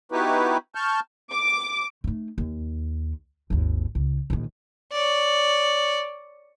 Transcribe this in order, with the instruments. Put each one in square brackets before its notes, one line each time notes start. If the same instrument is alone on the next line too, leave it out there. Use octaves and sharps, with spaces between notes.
[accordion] B3 D#4 E4 F#4 G4 B4
A5 C#6 F6 G6
[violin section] D6
[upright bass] A3 D#4
D#2
G#1 D#2
C#2
A#1 D#3
[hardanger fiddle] C#5 D5